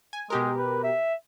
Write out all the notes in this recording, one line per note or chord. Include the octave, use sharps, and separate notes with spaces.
G#5
B2 G#3 G4 A#4
B4
E5